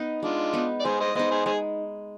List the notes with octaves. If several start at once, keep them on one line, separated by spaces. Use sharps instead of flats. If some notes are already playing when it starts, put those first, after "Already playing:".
Already playing: B3 D#4
G#3 D4 F4
B3 D#4
D5
G#3 G#4 C5
C5 D#5
B3 D#4 C5 D#5
G#4 C5
G#3 G#4 C5